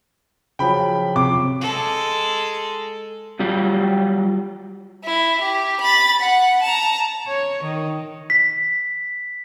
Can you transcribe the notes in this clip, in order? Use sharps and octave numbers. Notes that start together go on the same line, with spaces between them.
C#3 F3 F#3 G5 B5
C3 D6
G#3 A4
F#3 G3 F4 G4
E4
G4
B5 A6
F#5
A5 A#5
C#5
D#3
B6